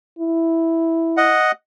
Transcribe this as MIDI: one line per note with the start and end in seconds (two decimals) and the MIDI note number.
0.19 1.36 64
1.17 1.52 75
1.17 1.52 78